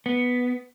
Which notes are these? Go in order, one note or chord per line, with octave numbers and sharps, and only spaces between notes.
B3